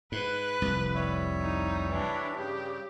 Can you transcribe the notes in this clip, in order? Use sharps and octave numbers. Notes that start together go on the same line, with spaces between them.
G#2 B4 F#6
F1 C2
G3 C#5 E5
D#4
E3 D4
G2 C#3 G4